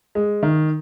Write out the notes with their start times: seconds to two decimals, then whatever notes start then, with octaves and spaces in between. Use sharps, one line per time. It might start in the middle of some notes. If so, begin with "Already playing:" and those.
0.15 G#3
0.43 D#3